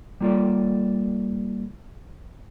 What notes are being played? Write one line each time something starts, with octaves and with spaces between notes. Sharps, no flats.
G3 A#3 F4 A4 D5